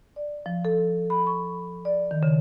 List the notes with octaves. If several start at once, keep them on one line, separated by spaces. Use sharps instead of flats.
D5
F3
A4
B5
C#6
D5
D#3
C#3